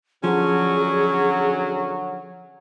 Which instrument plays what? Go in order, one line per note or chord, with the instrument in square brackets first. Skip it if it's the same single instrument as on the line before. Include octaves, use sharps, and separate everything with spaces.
[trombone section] D3 F#3 [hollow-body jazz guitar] F3 [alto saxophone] C#4 [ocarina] G#4